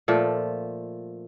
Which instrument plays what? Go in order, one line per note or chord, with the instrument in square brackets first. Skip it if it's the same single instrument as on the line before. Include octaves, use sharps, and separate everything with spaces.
[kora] A#2 F3 A3